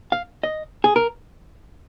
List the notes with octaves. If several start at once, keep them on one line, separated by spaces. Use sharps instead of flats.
F5
D#5
G#4
A#4